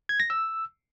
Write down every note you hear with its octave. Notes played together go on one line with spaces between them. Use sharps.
G#6
A#6
E6